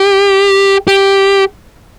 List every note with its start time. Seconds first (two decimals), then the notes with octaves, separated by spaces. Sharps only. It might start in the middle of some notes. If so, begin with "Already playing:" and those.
Already playing: G4
0.88 G4